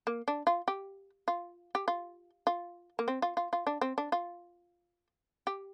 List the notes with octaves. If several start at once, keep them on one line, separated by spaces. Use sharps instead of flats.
A#3
D4
F4
G4
F4
G4
F4
F4
A#3
C4
F4
F4
F4
D4
C4
D4
F4
G4